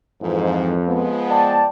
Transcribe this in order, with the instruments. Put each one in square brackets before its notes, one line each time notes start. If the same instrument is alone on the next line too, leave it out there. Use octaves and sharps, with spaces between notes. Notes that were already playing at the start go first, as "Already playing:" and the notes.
[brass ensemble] F2 [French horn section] G#2 E3
[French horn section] F3 G#3 B3
[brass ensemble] D5 G5 A5